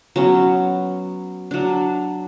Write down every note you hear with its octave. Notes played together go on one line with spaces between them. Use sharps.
F#3 B3 C#4
F#3 D4